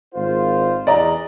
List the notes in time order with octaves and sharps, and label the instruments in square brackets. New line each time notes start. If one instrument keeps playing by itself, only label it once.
[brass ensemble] G#1 F4 C5
[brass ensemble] E2 [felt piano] D5 D#5 A#5